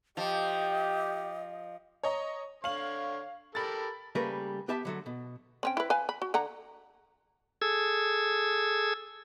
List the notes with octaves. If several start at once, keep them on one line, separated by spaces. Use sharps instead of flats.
F3 G4 D#5
C#5 D#5 A#5
D3 C#5 F5 F#7
G4 A4 A#4 B5 A6
C#3 G3 A3 A#3 A#4 B4
B3 G4 E5 A5
D3 F#3 A3
B2
C4 C#4 G5
E4 B4
B4 F5 G#5
B5
F#4
D3 F#5 A#5
G#4 A4 E6 G#6